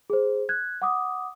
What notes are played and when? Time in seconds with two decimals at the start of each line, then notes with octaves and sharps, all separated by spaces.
0.10 G#4 C5
0.49 F#6 G#6
0.82 F#5 D6 D#6